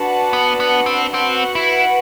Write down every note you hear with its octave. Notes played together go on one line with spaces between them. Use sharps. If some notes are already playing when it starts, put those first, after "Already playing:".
Already playing: D4 F#4 B4 F#5 A5
B3
B3
C4
C4 F#4 B4 F#5
E4